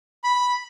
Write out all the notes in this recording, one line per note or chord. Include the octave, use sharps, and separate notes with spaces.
B5